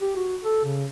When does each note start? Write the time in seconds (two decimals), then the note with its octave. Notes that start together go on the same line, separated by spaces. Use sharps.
0.01 G4
0.17 F#4
0.45 A4
0.65 C#3